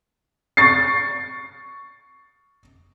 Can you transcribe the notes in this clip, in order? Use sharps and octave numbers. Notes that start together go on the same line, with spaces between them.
C#6 A6 C7